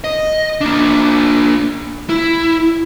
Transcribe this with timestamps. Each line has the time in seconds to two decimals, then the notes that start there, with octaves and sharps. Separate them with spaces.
0.04 D#5
0.61 A#3 D4
2.10 E4